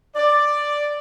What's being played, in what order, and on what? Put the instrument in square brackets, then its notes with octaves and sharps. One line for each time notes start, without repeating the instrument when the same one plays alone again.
[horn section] D5